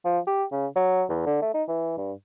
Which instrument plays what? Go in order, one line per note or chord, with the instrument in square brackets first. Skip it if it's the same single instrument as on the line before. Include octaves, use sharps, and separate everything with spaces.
[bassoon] F3
G4
C#3
F#3
E2
D3
A3
D#4
E3
G2